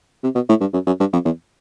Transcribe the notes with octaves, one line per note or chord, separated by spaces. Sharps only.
C3
B2
A2
G2
F#2
F#2
G2
F2
E2